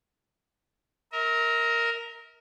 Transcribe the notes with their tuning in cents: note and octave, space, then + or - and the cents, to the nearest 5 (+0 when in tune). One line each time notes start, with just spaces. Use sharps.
A#4 +0 E5 -45